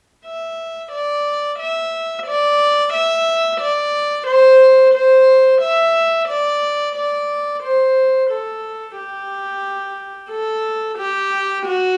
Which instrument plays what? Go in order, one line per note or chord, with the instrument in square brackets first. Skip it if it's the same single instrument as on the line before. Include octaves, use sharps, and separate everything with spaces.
[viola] E5
D5
E5
D5
E5
D5
C5
C5
E5
D5
D5
C5
A4
G4
A4
G4
F#4